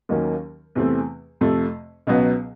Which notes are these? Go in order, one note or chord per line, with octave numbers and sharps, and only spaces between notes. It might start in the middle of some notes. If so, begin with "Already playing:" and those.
D#2 D#3 F#3 A#3 C#4
E2 C3 E3 A3 C4
F2 C3 F3 A3
C#2 B2 F#3 B3